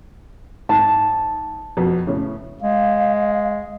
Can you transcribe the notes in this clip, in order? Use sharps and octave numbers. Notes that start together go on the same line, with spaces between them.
G#2 A5
F2 B2
A2 C#3
G#3 F5